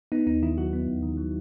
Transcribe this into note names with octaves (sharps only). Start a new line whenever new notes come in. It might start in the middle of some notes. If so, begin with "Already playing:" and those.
B3 D#4
D#2 D#4
D#3 E4
F#3 F#4
B3
D#2
D#3
F#3